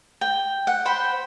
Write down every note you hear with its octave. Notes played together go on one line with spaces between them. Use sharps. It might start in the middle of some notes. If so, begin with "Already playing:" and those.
G5
F#5
C5 G5 B5